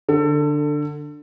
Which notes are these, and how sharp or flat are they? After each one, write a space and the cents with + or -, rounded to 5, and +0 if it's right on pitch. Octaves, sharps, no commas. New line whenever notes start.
D3 +10 A4 +25